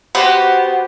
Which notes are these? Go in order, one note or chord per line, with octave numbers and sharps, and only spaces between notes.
B3 F#4 G4 C5